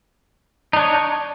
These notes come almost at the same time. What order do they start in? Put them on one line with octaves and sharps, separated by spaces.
D#4 D4 C#5